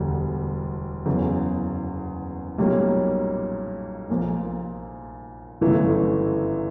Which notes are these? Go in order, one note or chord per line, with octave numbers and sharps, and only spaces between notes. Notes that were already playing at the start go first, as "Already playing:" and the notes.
Already playing: E1 D2 D3 G3
F#1 E2 C#3
B1 A#2 G3 A#3 C#4
A#1 A#2 F3
G1 F#2 C#3 E3 A3